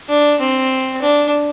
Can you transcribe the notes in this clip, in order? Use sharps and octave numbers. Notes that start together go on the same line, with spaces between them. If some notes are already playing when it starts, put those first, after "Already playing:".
D4
C4
D4